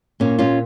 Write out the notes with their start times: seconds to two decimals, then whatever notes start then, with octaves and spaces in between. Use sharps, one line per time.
0.20 A#2 A#3 C#4
0.39 C#4 F4